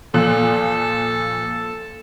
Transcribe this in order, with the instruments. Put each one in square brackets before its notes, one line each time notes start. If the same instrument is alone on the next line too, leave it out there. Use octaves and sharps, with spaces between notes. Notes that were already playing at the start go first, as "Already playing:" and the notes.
[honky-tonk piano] A#2 F3 F#6 [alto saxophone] A4